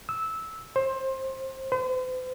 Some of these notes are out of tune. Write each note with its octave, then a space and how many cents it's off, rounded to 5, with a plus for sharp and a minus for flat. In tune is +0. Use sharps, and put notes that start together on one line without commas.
E6 -15
C5 +20
C5 -45